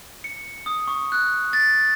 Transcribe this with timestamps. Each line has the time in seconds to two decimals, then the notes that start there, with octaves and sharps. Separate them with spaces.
0.24 C#7
0.66 D#6
0.88 C#6
1.12 F#6
1.53 A6